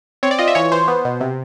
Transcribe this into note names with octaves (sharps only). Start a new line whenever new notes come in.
C4 C#5
D5
F4 D#5
E5
E3 C#5
E3 C5
B3
B2
C3